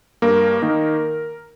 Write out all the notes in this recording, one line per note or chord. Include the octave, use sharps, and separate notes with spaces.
G2 A#3 A#4
D#3 A#3 D#4